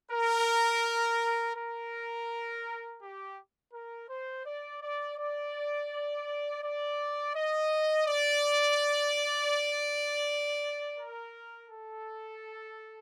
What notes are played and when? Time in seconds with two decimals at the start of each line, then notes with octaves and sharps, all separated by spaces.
0.12 A#4
1.56 A#4
3.02 G4
3.73 A#4
4.09 C5
4.46 D5
4.82 D5
5.18 D5
6.63 D5
7.36 D#5
8.07 D5
10.98 A#4
11.69 A4